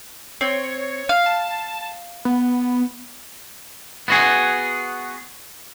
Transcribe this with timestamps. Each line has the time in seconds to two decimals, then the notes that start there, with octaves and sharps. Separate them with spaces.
0.41 C4 C#5
1.09 F5
1.26 A5
2.25 B3
4.08 B3 F#4 G#4